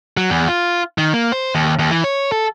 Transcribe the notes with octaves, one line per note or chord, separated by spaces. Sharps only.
F#3
E2
F4
D#3
A#3
C5
D#2
D#2
E3
C#5
A4